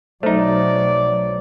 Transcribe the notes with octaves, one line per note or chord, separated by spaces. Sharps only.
B1 F#3 A3 D#4 C5 D5